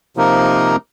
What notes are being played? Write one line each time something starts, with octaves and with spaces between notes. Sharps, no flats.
C3 F3 A#3 D#4 A#4